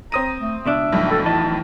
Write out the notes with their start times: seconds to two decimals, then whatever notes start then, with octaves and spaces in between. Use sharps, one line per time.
0.12 C4 A#5 D#6 D#7
0.39 A3
0.65 C#2 B2 D4 E5
0.93 B1 F2 A2
1.11 A4
1.25 E2 E3 D#5 A5